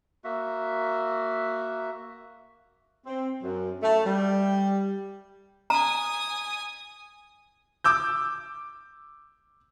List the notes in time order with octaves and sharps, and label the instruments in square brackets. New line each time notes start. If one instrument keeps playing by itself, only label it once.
[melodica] A#3 F#4 E5
[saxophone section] C4
F#2
A3
G3
[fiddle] G#5 D#6 [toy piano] A#5
[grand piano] D6 E6 G6